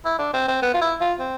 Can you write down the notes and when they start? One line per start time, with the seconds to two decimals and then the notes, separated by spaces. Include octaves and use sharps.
0.05 E4
0.19 D4
0.33 C4
0.48 C4
0.62 B3
0.74 F4
0.81 E4
1.00 F4
1.19 C4